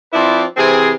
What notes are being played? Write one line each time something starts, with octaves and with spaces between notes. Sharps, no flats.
F3 C4 E4 B4 D5
C3 E3 C4 G#4